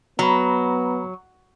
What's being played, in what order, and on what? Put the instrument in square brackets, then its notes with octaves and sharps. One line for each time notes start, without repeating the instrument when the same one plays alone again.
[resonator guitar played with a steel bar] F#3 [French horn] B3 [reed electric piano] A#5 B5